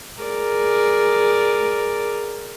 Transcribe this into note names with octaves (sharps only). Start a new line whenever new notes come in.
G#4 A#4 D5